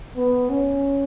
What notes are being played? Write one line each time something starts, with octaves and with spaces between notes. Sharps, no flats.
B3
C#4